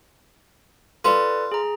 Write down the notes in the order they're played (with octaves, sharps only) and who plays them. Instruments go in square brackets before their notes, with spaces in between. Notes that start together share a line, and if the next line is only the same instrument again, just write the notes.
[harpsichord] F4 [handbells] A4 B4 D5
[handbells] G#4 A#5